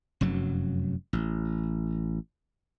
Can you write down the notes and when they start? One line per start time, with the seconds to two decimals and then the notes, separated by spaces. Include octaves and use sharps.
0.21 F1 F#2 F#3
1.13 A1